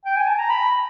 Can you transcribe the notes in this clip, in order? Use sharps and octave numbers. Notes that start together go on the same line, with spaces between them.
G5
G#5
A5
A#5
B5